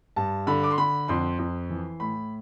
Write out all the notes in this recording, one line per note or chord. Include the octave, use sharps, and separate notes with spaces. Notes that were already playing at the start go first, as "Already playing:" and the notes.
G2 A5
D3 B5
D6
C6
D3 B5
F2 C6
F2
E3
A2 B5